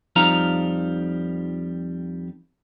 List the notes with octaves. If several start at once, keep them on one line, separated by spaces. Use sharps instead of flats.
F2 F3 G3 D#4 F5 A#5